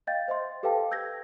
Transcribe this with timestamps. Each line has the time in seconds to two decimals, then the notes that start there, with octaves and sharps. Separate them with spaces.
0.07 D#5 F5 G5 G6 A6
0.28 C5 D#5 E5 C6
0.63 G4 A4 B4 F5 G5 A5
0.91 E6 G6 G#6 A#6